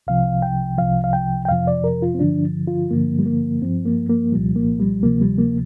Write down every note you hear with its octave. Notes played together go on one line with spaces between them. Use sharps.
C2 C3 F3 F5
G5
C2 C3 F3 F5
F5
G5
G5
F2 C3 F3 F5
D5
A#4
F4
C4
G2 D3 F3 D4
F4
G2 D3 F3 A#3
G3
A#3
G2 F3 C4
A#3
A#3
C2 A#2 F3 G3
A#3
G3
D2 C3 F3 A#3
G3
A#3